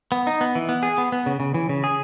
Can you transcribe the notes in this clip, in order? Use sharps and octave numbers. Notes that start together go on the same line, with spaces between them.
B3
D#4
B3
E3
B3
G#4
B3
B3
C#3
C#3
E3
C#3
G#4